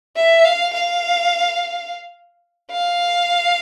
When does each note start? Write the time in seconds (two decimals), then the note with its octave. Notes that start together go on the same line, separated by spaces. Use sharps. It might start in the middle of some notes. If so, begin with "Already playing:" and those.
0.16 E5
0.45 F5
0.73 F5
2.72 F5